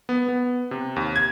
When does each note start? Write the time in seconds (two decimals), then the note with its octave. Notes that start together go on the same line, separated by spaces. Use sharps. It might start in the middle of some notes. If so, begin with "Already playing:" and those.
0.09 B3
0.29 B3
0.71 C3
0.96 D#2
1.16 G#6